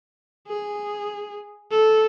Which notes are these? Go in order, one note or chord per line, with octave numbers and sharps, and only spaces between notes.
G#4
A4